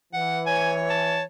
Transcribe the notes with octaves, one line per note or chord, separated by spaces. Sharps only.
E3 F#5
C#5 G#5
A5